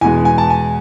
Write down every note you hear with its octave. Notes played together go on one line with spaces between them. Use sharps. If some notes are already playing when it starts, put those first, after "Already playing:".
E2 B2 G#3 G#5
G#5
A5
G#5